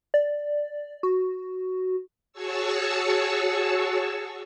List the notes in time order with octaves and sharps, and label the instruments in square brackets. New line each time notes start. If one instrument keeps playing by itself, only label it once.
[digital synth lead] D5
F#4
[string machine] F#4 G#4 C#5 A5 C#6 E6